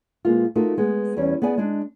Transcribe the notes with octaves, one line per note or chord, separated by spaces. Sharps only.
B2 G#3 A#3 F4
A3 D#4 F4 F#4 A#4
G#3 B3
E2 G3 C#4
B3 G#4 D5 G#5
G#3 D4